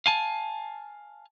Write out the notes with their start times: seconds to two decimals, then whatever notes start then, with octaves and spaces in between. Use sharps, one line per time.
0.06 F5 G#5 A5